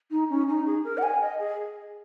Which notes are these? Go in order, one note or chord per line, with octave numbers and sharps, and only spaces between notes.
D#4
C#4
D#4
G#4
A#4
F#5
G#5
D#5
G#4